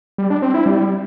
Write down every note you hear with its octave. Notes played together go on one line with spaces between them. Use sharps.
G3
D4
C4
E4
G3